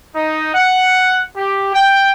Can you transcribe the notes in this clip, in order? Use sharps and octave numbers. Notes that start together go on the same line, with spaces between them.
D#4
F#5
G4
G5